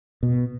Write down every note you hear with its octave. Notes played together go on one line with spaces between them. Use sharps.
B2